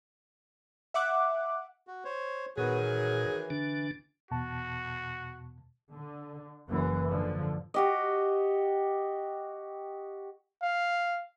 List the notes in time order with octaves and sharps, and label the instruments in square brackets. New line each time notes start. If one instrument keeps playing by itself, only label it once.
[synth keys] E5 F#5 D6 F#6
[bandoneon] F#4
C5 C#5
[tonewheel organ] A#2 [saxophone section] D#3 F#3 G#4 [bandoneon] B3 F#4
[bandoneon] E3
[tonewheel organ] D3 D4
[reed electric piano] E2 B2 A5 [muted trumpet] F#4
[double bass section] D3
F#1 F#2 E3
G#2 D3 F3
[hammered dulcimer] F#4 G4 D#5
[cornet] F5